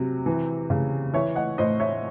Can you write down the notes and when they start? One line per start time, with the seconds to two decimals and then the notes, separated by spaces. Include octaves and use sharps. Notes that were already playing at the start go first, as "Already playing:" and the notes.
Already playing: C3 F#3
0.26 E3
0.70 C#3
1.14 E3 C#5 E5
1.36 D#5 F#5
1.58 A2 C5 D#5
1.80 C#5 E5